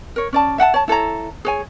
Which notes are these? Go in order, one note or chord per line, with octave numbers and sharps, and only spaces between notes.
A#4 C#5
C#4 D5 A5
E5 F#5 G5 A5
C#5 A5
E4 A4 C#5 A#5
G#4 C#5 G#5